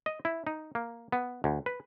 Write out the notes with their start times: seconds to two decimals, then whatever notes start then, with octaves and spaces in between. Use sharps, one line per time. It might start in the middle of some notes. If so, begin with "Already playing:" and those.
0.06 D#5
0.25 E4
0.47 D#4
0.75 A#3
1.12 B3
1.44 D2
1.66 B4